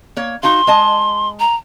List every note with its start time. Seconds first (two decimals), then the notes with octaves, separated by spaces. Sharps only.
0.17 A#3 C#5
0.43 D#4 F#4 F5 C6
0.67 G#3 D#5 A5
1.40 A#5